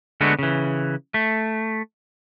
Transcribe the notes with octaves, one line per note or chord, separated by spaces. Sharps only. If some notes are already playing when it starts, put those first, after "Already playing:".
D3 G#3 A3 B3 F#4
C#3 E3
A3